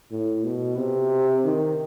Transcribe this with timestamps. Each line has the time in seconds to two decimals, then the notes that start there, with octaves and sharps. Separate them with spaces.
0.11 A2
0.44 B2
0.78 C3
1.44 D#3